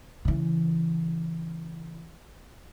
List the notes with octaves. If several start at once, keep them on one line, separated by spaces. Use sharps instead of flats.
C#3 E3